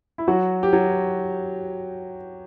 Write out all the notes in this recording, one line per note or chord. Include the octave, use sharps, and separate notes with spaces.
E4
F#3 F#4
G4
F#3 F#4